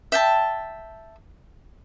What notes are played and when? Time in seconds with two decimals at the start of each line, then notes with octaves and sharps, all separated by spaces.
0.12 E5 G5 A5